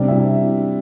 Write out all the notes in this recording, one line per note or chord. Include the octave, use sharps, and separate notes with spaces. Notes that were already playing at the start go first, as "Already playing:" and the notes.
Already playing: C3 G3 C4 D4 D5
E4 E5